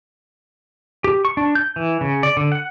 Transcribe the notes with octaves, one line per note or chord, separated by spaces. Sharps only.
G4
C#6
D4
G6
E3
C#3
D5
D3
F#5